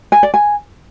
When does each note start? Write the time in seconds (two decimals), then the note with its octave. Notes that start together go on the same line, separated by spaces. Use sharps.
0.12 G#5
0.23 D5
0.34 G#5